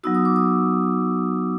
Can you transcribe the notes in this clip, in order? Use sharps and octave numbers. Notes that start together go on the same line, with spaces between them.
F#3 B3 D#4 F#4 E6
D#6
D6
D#6